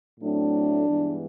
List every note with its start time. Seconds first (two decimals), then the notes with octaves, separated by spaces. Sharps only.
0.21 A2 F#3 A3 C4 D4
0.89 G2 E3 G#3 B3